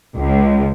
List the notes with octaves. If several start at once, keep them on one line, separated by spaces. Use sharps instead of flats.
C#2